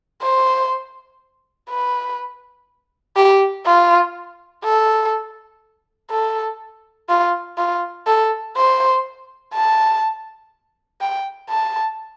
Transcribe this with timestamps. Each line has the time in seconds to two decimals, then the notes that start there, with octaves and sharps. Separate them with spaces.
0.22 C5
1.70 B4
3.17 G4
3.66 F4
4.64 A4
6.11 A4
7.09 F4
7.58 F4
8.07 A4
8.56 C5
9.54 A5
11.01 G5
11.50 A5